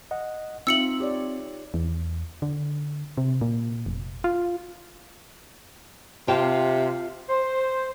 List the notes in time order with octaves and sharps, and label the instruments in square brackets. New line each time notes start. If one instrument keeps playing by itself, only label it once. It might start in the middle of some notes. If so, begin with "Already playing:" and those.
[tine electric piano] D#5 F#5
[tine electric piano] C4 [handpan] D#4 F4 E5 [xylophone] E6 C#7 F#7
[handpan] G4 C#5 D5
[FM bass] E2
D3
C3
A#2
F1
F4
[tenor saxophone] C3 [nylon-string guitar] F4 G5 A5
[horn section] C5